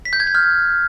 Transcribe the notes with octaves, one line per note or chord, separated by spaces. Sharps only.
B6
G6
G#6
G6
F6